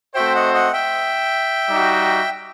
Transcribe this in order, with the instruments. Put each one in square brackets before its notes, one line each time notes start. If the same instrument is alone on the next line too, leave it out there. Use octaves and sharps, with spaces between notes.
[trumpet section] A3 C4 F#4 C5 [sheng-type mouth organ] E5 G5
[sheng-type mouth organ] D#5 F#5
D#5 F#5
E5 G5
[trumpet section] G3 D#4 F#4